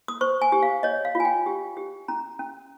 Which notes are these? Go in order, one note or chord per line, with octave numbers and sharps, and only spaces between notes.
D#6
C5 C#6
G#5
G4
F5
C#5 D#5
F5
F4
G#5
G5
G4
G4
C#4 A#5
C#4